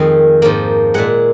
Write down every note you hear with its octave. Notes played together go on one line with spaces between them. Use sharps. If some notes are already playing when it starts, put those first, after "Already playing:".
Already playing: F2 D#3 G#3 F5
G#2 F3 A#3
A#2 G#3 F#5